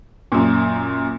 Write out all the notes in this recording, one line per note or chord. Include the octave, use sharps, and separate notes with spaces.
F#2 A#2